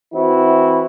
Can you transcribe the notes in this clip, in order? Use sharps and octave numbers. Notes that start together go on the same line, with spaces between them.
E3 C4 E4 F#4